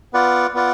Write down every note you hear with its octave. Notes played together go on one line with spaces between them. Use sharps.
B3 F4 B4 D5 F#5
B3 F4 B4 D5 F#5